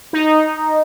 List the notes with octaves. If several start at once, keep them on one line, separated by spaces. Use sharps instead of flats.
D#4